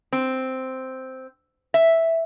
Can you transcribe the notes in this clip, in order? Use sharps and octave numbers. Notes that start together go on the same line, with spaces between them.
C4
E5